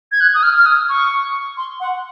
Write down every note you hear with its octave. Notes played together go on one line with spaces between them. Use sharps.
G#6
F#6
D#6
F6
F6
D#6
C#6
C6
F#5